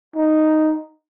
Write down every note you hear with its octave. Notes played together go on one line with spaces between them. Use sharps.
D#4